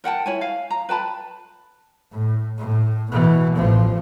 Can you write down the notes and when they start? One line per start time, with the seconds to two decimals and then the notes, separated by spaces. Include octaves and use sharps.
0.04 A#4 F#5 G5 A5
0.26 E4 C#5 G#5
0.41 F5
0.70 A#5
0.89 B4 G5 A5 B5
2.11 A2
2.58 A2
3.11 B2 E3
3.55 A1 F3